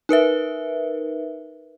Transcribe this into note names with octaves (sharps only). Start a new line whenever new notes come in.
D#4 A#4 B4 E5